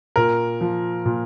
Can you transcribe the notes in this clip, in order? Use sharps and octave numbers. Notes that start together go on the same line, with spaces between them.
A#2 A#4
F3
A#2